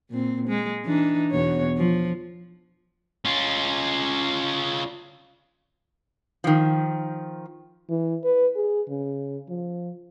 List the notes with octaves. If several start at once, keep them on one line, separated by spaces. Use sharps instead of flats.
A#2 C4
G#3
E3 D4 D#4
E2 B2 C#5
F3
C#4 F4
D#3 F3
E3
B4
G#4
C#3
F3